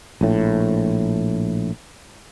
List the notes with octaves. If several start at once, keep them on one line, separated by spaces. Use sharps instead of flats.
A#1 A2